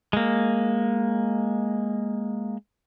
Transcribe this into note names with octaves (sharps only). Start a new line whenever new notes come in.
G#3 A#3